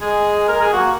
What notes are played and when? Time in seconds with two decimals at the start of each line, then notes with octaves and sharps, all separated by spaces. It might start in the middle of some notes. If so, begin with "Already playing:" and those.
0.01 G#3 G#4
0.48 A#4
0.61 G#4
0.73 A#3 F#4